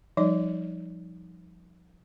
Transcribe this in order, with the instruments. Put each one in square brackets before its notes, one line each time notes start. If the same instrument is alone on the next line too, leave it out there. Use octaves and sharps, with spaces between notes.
[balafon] F3 G3 D#4 D5